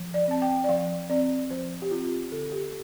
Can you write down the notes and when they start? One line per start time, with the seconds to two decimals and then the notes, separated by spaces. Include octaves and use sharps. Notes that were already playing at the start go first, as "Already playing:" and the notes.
Already playing: F3
0.14 D5
0.28 C4 A5
0.42 G5
0.64 D5
0.69 F3 F5
1.10 C4 D5
1.50 F3 C5
1.82 G4
1.91 C4 F4
2.32 D3 A4
2.52 G4